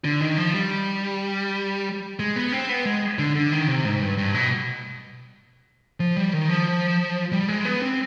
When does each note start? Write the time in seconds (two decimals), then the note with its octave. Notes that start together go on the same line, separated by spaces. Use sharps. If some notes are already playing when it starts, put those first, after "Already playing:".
0.04 D3
0.21 D#3
0.37 F3
0.54 G3
2.19 G#3
2.36 B3
2.52 C4
2.69 B3
2.85 G#3
3.18 D3
3.35 D3
3.52 D#3
3.68 C3
3.85 G#2
4.01 G2
4.18 G2
4.35 B2
6.00 F3
6.16 G3
6.33 D#3
6.50 F3
7.32 G3
7.48 G#3
7.65 B3
7.82 C4